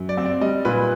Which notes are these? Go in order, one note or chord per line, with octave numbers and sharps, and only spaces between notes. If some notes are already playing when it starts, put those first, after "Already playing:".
Already playing: F#2
D5
C4
D5
G3 D#5
A#2 B4